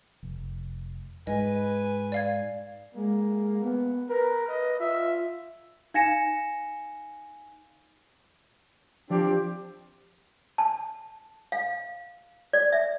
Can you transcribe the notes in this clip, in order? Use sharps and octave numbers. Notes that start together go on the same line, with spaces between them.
F1
G#2 B4 D#5 G#5
D5 F5 G#6
G#3 A#3
B3
A#4 B4
D#5
F4 E5
D#4 F5 G#5 A#6 C#7 E7
F3 C4 D4 G4
A5
F5
D5
E5